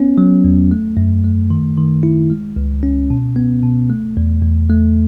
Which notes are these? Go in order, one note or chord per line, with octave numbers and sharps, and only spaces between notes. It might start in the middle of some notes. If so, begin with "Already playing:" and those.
Already playing: B3 C#4
F#3
E2
A3
F#2
A3
D#3
D#3
E4
G#3
C#2
C#4
B2
B3
B2
A3
E2
E2
A3